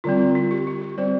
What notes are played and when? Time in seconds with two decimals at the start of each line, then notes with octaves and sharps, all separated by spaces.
0.04 D3 G3 C4 F4
0.20 F4
0.35 F4
0.51 G4
0.67 G4
0.82 G4
0.98 G3 C4 C5